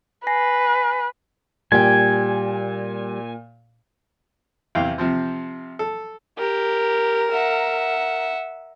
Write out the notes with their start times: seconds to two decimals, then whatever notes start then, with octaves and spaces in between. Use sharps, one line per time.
0.27 B4 G#5 A#6 C7
1.72 A#2 G3 G4 G5 G#5
4.75 E2 C3 E3 F5 G5
4.98 C3 F3 C4
5.79 A4
6.38 G4 A#4
7.32 E5 F#5